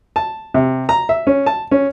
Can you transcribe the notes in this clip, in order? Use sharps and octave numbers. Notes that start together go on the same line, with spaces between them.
A5
C3
A#5
E5
C#4
A5
C#4